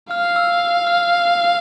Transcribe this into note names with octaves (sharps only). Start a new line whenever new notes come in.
F5 F6
F6
E6
F6